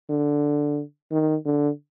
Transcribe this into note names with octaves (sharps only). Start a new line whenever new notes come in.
D3
D#3
D3